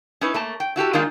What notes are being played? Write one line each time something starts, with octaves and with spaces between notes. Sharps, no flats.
C#4 D#4 E4 B4
A3 A#3 A5
G5
E4 F#4 G4 A4
D#3 G#3 A#3 D4 D#4 F4